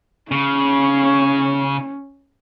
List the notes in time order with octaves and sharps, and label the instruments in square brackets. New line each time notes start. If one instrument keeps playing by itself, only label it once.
[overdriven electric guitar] C#3 [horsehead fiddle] C#4